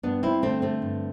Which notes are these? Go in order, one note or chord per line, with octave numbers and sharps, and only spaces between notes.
G2 B3 D4
C4 E4
D3 A3 C4
A3 C4
G2